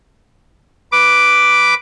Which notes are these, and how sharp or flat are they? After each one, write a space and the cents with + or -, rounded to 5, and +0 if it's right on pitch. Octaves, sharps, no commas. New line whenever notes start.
B4 +0 D6 +0